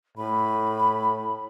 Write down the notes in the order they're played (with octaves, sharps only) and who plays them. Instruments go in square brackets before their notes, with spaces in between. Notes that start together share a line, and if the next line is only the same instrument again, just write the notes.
[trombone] A2 [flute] B5